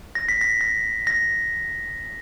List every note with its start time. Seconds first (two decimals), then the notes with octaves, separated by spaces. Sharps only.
0.15 A#6
0.29 B6
0.41 A#6
0.61 A#6
1.07 A#6